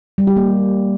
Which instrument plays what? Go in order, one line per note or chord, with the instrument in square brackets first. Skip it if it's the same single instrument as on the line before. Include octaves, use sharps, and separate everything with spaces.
[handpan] G3
G4
A#3